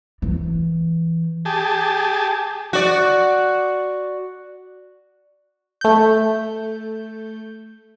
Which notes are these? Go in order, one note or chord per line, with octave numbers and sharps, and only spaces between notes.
E3
G4 G#4 A5
F#4 D5
A3 G6